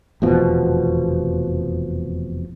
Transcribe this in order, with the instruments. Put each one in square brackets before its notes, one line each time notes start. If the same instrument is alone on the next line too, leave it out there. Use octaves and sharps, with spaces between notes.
[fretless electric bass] F1 E2 B2 F3